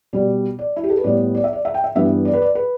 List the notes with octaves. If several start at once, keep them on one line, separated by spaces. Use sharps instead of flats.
B2 G3 B3 D5
D5
E4
G4
A4
B4
A2 G3 B3 D5
D5
E5
D5
E5
G5
E5
G2 E3 G3 B3 E5
D5
B4
D5
B4